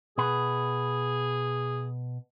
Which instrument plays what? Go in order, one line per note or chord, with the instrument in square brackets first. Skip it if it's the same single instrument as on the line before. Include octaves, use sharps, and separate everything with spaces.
[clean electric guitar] B2 B4 [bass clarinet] G#4